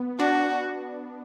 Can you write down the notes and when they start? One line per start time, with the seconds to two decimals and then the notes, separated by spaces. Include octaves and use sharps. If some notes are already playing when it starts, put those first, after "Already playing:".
Already playing: B3
0.19 D4 F#4